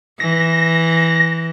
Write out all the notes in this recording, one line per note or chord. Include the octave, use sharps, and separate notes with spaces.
E3 A#6